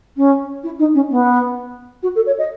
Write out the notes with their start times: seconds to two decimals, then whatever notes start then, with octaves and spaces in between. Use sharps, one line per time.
0.17 C#4
0.63 E4
0.79 D#4
0.94 C#4
1.10 B3
2.03 F#4
2.15 A4
2.26 C#5
2.38 D#5